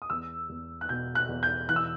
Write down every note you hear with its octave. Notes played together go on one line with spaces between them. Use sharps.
D#6
E2 E6
E2
F#6
B2 G6
F#6
E2
G6
E3 F#6
E6